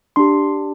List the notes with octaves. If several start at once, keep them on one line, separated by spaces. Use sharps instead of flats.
D4 G4 C6